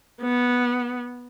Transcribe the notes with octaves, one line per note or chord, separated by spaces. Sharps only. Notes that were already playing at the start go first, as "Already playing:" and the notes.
B3